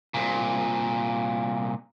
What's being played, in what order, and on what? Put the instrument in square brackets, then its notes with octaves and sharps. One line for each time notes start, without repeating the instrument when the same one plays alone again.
[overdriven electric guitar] C2 A#2